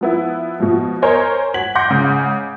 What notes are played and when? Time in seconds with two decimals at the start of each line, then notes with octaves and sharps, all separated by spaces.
0.01 F3 B3 E4
0.60 B2 F3
1.02 A#4 C5 C#5 D#5 G#5
1.54 F#4 G#6 B6 F#7
1.75 F#5 C6 D6 G6 A#6
1.89 G#2 C#3 F#5